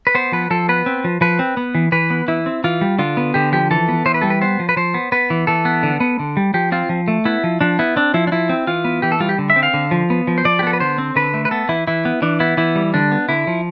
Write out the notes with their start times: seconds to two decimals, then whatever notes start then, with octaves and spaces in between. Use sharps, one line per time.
0.07 B4
0.15 B3 C5
0.32 F3 B4
0.50 F3 A4
0.69 B3 B4
0.86 C4
1.04 F3
1.21 F3 B4
1.39 C4
1.57 B3
1.75 E3
1.92 E3 B4
2.10 B3
2.28 E3 E4
2.46 C4
2.64 E3 F4
2.81 G3
2.99 D3 F4
3.17 B3
3.34 D3 G4
3.52 F3 G4
3.71 E3 A4
3.89 B3
4.06 E3 C5
4.14 B4
4.22 G3 A4
4.30 B4
4.41 B3 C5
4.59 F3
4.69 B4
4.77 F3 C5
4.94 B3
5.12 B3 B4
5.30 E3
5.47 E3 A4
5.65 B3
5.83 D3
6.00 B3
6.19 D3
6.37 G3
6.54 F3 G4
6.72 C4 F4
6.89 F3
7.08 A3
7.25 B3 E4
7.44 F3
7.61 F3 D4
7.79 B3 E4
7.96 C4 D4
8.14 F3 E4
8.27 D4
8.32 F3 E4
8.49 C4
8.67 E3 F4
8.85 B3
9.02 E3 G4
9.12 A4
9.20 G3 F4
9.29 G4
9.38 D3
9.50 E5
9.56 C4
9.63 F5
9.74 D3
9.91 F3
10.10 B3
10.27 F3
10.38 C5
10.45 F3 D5
10.59 G4
10.63 B3 A4
10.73 B4
10.80 D3 C5
10.98 C4
11.16 D3 B4
11.34 A3
11.45 B4
11.51 B3 A4
11.69 E3 E4
11.87 E3 E4
12.05 B3
12.22 E3 D4
12.40 B3 E4
12.57 E3 E4
12.76 G3
12.94 D3 D4
13.12 B3
13.29 D3 E4
13.47 F3